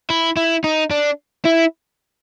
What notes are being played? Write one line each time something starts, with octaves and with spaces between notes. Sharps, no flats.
E4
E4
D#4
D4
E4